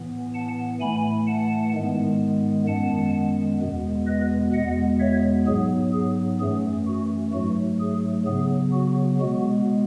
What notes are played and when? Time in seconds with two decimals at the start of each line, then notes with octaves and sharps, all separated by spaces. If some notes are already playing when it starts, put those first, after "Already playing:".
Already playing: A2 E3 B3
0.34 F#5 A5
0.80 A2 E3 A3 G#5 B5
1.27 F#5 A5
1.74 G#2 D#3 G#3 B3
2.67 F#2 D#3 G#3 B3 F#5 A5
3.60 E2 B2 G#3 B3
4.07 B4 D#5
4.53 E2 B2 G#3 B3 D#5 F#5
5.00 C#5 E5
5.46 G#2 F#3 B3 G#4
5.92 G#4
6.40 F#2 E3 A3 G#4
6.86 F#4
7.32 G#2 F#3 A3 F#4
7.80 G#4
8.25 C#3 F#3 B3 G#4
8.72 F#4
9.19 B2 G#3 B3 F#4